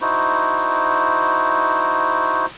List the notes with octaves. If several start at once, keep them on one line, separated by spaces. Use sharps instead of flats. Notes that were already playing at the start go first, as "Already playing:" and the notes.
D#4 E4 F#4 C5